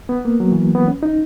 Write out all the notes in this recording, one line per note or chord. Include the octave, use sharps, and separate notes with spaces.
B3
A#3
F#3
E3
B3
C#4
D#4